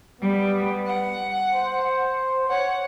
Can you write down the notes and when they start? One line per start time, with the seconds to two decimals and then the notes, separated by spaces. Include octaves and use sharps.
0.21 G3 B3
0.86 F#5
1.53 C5
2.49 C#5 F#5